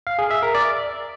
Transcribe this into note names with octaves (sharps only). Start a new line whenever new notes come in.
F5
G#4
E5
A#4
D5